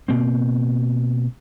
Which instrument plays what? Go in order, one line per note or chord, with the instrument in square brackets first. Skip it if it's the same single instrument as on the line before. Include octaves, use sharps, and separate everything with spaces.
[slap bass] B2 A#3 C4